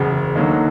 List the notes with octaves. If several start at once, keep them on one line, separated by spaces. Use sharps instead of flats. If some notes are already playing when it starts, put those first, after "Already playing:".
Already playing: F#1 E2 C#3
D#2 D3 F#3 A#3 D#4